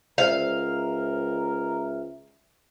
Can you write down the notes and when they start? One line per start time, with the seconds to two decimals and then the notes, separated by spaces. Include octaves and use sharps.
0.18 C#2 A#4 C5 E5 F5 F6